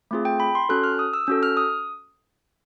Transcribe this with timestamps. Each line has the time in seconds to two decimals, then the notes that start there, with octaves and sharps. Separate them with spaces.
0.11 A3 C4 F4 G#4
0.25 G5
0.40 B5
0.55 C6
0.69 C#4 F#4 A4 F#6
0.84 F6
0.99 D#6
1.14 E6
1.27 C#4 F#4 A4 E6
1.43 F6
1.57 D#6